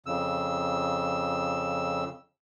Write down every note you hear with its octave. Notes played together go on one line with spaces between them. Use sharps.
F2 C#3 E6